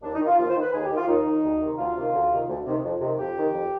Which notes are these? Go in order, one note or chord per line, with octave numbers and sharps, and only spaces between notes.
D#2 D4
D#4
D#3
F4
D#2 F4
C5
D#3
B4
D#2 G#4
G4
D#3
F4
D#2 D#4
D#3
D2
C3 D#3
D2 F4
C3 D#3
D2
C3 D#3
D2
C3 D#3
F2
C3 D#3
F2 G4
C3 D#3
F2